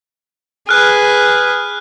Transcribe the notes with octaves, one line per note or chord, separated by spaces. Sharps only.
G#4 B4 F6 F#6